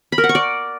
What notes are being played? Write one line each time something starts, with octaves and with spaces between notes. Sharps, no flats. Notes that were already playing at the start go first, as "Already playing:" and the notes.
B5
A#4
F#5
C#6
D5